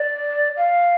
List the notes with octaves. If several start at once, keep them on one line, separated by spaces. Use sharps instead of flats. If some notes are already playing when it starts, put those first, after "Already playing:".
Already playing: D5
F5